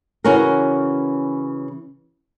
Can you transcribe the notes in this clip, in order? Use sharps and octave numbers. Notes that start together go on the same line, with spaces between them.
C#3 E3 C#4 F#4 A#4